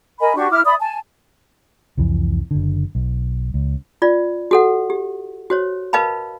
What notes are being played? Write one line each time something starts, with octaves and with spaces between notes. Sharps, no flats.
A#4 D#5 G#5 B5
D4 F#4 G4 C#6
E4 D6 F6
D5 E5 B5 D#6
G#5 A5
C2 F2 E3
F#1 D3
B1
C#2
F4 D5
F#4 A4 F#5
G4
F#4 C5 C#5
A#4 B4 D#5 F5 A5 B5